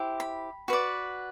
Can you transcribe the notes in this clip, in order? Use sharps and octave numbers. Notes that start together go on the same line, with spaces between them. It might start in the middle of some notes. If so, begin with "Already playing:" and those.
Already playing: E4 G4 C5
B5
F#4 B4 D5